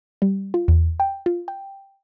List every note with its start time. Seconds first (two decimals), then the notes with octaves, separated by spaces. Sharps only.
0.22 G3
0.54 F4
0.68 E2
1.00 G5
1.26 F4
1.48 G5